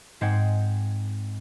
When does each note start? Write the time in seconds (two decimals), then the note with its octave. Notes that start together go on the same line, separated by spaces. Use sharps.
0.21 G#2 G#3 C4 F#5 G5 G#6